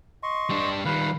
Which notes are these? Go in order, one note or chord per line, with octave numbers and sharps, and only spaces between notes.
D#5 C6 C#6
G3 D4
D#3 G3 B4 F5